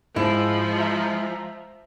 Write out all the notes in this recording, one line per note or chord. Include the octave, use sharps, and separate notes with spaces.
G#2 F3 G#3 E4
E5 A#5